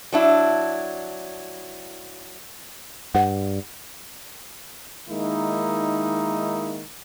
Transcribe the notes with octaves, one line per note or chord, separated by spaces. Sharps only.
F#3 D4 E4
G2 F#5
D#3 G#3 A#3 D#4 E4